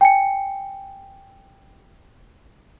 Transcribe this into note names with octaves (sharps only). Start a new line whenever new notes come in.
G5 G#5 C#7